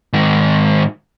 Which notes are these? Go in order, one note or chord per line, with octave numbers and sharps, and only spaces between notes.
G#2 D#3